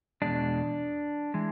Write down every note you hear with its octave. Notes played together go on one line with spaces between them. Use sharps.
E2 B2 G#3 D4
E3 G#3